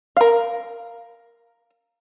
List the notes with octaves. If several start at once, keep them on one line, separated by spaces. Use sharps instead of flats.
A#4 F5